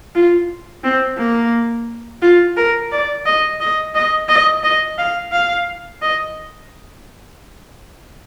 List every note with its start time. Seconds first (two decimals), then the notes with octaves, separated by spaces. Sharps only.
0.15 F4
0.84 C4
1.18 A#3
2.22 F4
2.57 A#4
2.92 D5
3.26 D#5
3.60 D#5
3.95 D#5
4.28 D#5
4.63 D#5
4.98 F5
5.32 F5
6.02 D#5